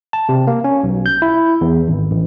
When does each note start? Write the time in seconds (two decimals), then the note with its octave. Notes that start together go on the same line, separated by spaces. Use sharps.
0.13 A5
0.29 C3
0.47 A#3
0.64 C#4
0.83 B1
1.06 G6
1.22 E4
1.61 E2
1.88 G#1
2.11 A1